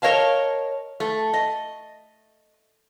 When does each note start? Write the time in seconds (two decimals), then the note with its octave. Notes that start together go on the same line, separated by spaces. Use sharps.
0.02 A#4 C#5 D#5 F5 A5
1.00 A3
1.34 D#5